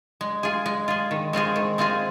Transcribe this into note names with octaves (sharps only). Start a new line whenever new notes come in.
G#3
F4 G#4
G#3
F4 G#4
D#3
G#3 C4 F4 G#4
D#3
G#3 C4 F4 G#4